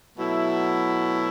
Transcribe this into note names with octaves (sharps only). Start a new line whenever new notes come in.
B2 F#3 A3 E4